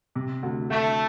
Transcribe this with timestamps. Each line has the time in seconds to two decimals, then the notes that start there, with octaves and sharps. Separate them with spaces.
0.15 C3
0.43 D2
0.70 D2 A3